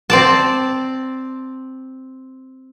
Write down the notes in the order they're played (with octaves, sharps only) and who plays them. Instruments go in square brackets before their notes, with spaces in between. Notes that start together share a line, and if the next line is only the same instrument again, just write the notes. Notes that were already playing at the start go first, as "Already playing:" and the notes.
[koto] C4 D5 A5